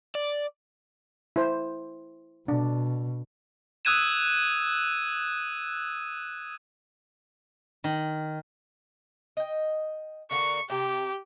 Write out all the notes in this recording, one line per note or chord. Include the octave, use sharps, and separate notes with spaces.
D5
E4 C5
B2 D4
D#6 E6 F#6 G#6 D#7 E7
D#3
D#5 G5
D3 A#3 F#4 C#6
C3 G4 G5